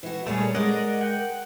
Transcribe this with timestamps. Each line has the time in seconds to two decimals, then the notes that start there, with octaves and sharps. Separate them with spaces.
0.03 E3 F#4
0.27 A#2 G3 A3 G#4 C#5
0.54 G#3 A#4 D5 D#5 F#5
1.01 F#5 G5